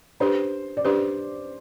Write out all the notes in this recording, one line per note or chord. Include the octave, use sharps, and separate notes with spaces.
D4 G4 B4 C5
D5
D4 G4 B4 C5